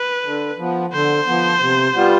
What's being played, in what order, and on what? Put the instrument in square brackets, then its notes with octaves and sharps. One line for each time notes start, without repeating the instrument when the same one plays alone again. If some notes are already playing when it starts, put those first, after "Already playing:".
Already playing: [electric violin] B4
[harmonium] D3
F3 B3
[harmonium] D3 [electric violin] C5
[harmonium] F3 B3
C3
G3 B3 F4